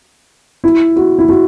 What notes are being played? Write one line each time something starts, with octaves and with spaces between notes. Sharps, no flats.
E4
F#4
E4
F#4